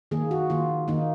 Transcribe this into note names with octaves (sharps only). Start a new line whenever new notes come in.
D#3 A#3 G#4
F#4
D#3 A#3 F4
D#3 A#3 D#4